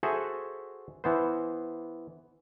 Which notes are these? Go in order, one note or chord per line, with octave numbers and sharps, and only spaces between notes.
F#4 G#4 A4 C5 E5 F#5
E3 B3 C5